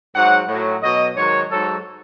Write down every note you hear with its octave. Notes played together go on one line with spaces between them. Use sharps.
G#2 F#3 F#5
A2 F#3
B2 F#3 D#5
G#2 D#3 F#3 C#5
G#2 F#3 A4